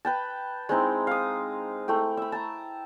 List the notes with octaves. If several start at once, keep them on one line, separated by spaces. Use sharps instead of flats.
B4 G5 A5
G#3 C4 D#4 E4
F5 D#6
A3 E4 G5
E5 B5
A5 A#5